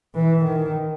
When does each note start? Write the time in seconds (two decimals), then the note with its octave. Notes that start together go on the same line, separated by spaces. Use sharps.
0.15 E3
0.44 D#3